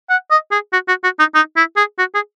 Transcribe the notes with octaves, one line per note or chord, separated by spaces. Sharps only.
F#5
D#5
G#4
F#4
F#4
F#4
D#4
D#4
E4
G#4
F#4
G#4